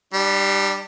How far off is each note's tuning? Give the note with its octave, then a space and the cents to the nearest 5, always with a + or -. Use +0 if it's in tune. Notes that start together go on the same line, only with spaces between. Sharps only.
G3 +0 D4 +40